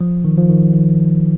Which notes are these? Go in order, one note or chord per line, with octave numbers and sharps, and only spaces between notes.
F3
D#3
F3
D#3
D#3